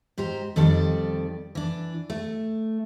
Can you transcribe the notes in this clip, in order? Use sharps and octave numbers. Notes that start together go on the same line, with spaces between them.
G#2 G4 C5 A#5
F2 D#3 G3 A4 D5
E3 D4
A3